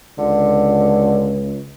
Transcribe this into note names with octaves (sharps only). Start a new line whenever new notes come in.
C#2 D3